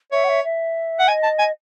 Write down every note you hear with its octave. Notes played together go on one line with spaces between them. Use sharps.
C#5 E5
F#5
E5
E5
F#5
D#5 G#5
A5
G#5